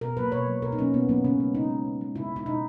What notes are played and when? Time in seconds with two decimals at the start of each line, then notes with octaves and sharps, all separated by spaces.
0.01 B2 A#4
0.17 F#3 A#3 B4
0.32 B2 C#5
0.47 F#3 A#3
0.62 B2 A#4
0.72 D#4
0.78 F#3 A#3 C#4
0.93 B2 B3
1.09 F#3 A#3 B3
1.24 C#3 C#4
1.40 G#3
1.55 C#3 D#4
1.70 G#3
1.85 C#3
2.01 G#3
2.16 C#3 E4
2.31 G#3 E4
2.46 B2 D#4